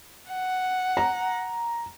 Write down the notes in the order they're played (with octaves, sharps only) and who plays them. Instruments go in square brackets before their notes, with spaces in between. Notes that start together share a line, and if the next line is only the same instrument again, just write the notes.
[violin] F#5
[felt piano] A#5